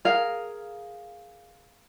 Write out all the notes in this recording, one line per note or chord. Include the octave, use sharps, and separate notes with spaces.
G#4 A#4 F5